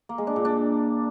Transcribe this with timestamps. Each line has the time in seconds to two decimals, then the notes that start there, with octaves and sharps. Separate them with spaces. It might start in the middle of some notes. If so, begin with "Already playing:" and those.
0.09 A#3
0.18 G#3
0.27 D4
0.36 A#2
0.45 D4